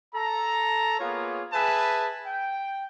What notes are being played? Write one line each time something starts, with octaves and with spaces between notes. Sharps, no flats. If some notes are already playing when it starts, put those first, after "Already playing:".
A4 A#5
A#3 B3 F4 G#4 C#5
G#4 B4 E5 G#5 A5
G5